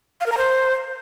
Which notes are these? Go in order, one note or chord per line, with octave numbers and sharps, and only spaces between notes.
F5
A#4
A#5
C5